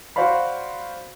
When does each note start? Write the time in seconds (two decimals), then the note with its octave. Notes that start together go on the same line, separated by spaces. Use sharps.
0.16 F#4 C5 D5 F5 B5